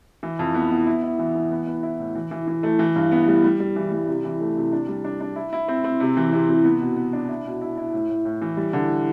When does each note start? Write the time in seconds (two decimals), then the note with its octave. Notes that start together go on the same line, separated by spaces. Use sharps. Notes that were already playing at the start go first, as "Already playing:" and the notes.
0.23 E3
0.39 F2
0.55 B3
0.71 B3
0.86 E4
1.03 E4
1.19 E3
1.35 E3
1.51 B3
1.67 B3
1.83 E4
1.99 A2
2.15 E3
2.31 E3
2.47 E3
2.63 A3
2.79 E3
2.96 G2
3.12 B3
3.28 G3
3.44 G3
3.60 G3
3.76 E3
3.92 G3
4.07 C3
4.24 E3
4.40 A3
4.56 C3
4.72 D4
4.88 G3
5.04 D4
5.21 D4
5.36 E4
5.53 E4
5.68 C4
5.84 C4
6.00 C3
6.17 E3
6.33 C3
6.49 C3
6.64 B3
6.81 B2
6.96 B3
7.13 D4
7.29 E4
7.45 B2
7.61 E4
7.77 E4
7.93 A2
8.10 A2
8.25 A2
8.42 E3
8.57 G3
8.73 D3